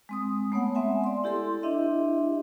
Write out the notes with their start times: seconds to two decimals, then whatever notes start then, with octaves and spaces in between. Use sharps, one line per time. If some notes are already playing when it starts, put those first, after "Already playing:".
0.09 G#3 C4 D#6
0.52 A3 B3 C#5 F#5
0.75 G#3 C4 E5 F#5 G#5
1.04 D5 C6
1.24 E4 G4 A4 C6
1.63 D4 E4 G4 D#5 E5